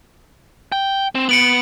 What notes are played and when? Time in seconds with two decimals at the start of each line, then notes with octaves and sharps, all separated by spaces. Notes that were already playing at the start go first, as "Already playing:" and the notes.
0.72 G5
1.15 C4
1.29 B3 C#7 D7 F#7